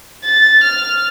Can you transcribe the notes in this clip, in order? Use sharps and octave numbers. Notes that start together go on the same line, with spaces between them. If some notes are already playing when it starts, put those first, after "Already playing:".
A6
F6